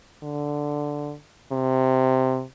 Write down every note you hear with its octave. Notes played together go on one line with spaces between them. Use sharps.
D3
C3